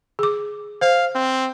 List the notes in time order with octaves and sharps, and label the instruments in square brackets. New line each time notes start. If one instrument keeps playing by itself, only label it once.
[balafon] G#4 D6
[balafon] C5 [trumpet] F5
[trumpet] C4